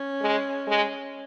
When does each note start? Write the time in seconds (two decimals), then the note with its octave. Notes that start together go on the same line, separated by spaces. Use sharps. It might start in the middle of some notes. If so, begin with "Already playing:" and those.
Already playing: C#4
0.22 G#3
0.68 G#3